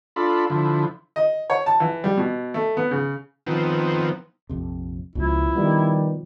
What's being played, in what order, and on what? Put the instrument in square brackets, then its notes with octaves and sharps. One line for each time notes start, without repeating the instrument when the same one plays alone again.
[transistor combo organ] D4 F4 A4 B5
D3 F3 E4
[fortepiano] D#5
C#5
A5
E3
G3
B2
A3
B3
C#3
[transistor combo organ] D#3 F3 B3 C4
[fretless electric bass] A#1 F2 C3
[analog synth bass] C#2 [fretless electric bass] B2 F3 [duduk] E4
[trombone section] D#3 G3 [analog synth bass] B3